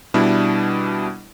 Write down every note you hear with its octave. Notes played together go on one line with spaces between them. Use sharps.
B2 G3 D4 E4